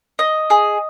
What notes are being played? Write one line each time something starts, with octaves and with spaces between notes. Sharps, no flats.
D#5
G#4